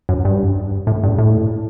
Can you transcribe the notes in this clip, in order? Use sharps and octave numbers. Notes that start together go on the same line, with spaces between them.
F#2
G2
A2
G2
A2